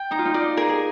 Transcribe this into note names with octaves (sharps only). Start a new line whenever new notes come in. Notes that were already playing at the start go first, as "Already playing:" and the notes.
Already playing: G5
D#4 A#5
F4
D#4
F4 D5
G#4 A#4
G#4